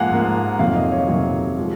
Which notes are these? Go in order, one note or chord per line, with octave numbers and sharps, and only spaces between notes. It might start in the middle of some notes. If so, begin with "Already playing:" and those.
Already playing: G#2 F3 A#3 F5 F#5 G#5
G#2 F3 A#3
F2 C3 D#3 F#3 A#3 F5
D#5
C#5
F2 C3 D#3 F#3 A#3
F3 G#3